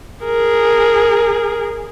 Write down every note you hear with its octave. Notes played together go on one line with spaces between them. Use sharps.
G#4 A#4